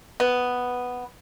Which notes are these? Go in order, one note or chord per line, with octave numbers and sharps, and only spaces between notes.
B3